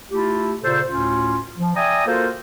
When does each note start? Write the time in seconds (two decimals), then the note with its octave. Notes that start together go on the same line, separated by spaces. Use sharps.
0.11 A3 E4 F4 G4
0.63 A#2 C#3 A4 C5
0.89 D2 A2 C#4 F4
1.58 F3
1.76 D5 E5 G5 G#5 A#5 D#6
2.07 A#3 F4 F#4 A4 A#4 C5